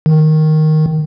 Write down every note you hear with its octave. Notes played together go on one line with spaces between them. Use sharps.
D#3